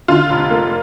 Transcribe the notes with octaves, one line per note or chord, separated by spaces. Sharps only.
D3 F4
F1
A#3